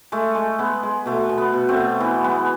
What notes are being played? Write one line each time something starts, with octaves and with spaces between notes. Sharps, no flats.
G#3 A3
G#3
G#3 B3
G#3
B2 A3
B2
B3
B2
A3 C4
B2
E3 B3
G#3 B3